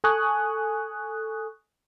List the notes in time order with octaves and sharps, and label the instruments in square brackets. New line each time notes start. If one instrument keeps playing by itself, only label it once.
[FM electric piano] A4 G#5 C#6 D#6 F#6